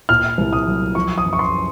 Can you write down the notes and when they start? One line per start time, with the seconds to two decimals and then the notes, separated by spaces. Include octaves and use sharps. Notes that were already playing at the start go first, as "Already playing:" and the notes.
0.09 A#2 F6
0.38 C2
0.53 D#6
0.67 F#3
0.95 F3 C#6
1.18 D#6
1.25 F#2
1.33 C#6
1.39 C6